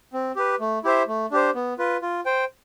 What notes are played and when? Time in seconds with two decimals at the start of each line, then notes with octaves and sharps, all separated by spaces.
0.13 C4
0.36 G4 B4
0.60 A3
0.84 E4 G4 C5 E5
1.07 A3
1.31 D4 G4 C5
1.55 B3
1.78 F4 B4
2.02 F4
2.26 C5 G5